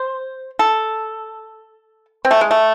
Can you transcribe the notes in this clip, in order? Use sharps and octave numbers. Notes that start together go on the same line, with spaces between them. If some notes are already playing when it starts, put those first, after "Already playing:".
Already playing: C5
A4
C4
A3
G#3
A3